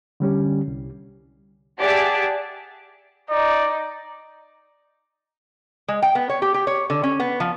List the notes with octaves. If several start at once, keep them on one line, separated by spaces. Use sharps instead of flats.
D3 G3 C#4 G4
C2
G4 G#4 D5 E5 F#5 A5
D#4 D5
G#3
G5
B3
C#5
G4
G4
C#5
D3
C#4
B3
F3